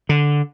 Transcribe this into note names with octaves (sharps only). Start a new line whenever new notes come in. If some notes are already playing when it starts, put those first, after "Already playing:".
D3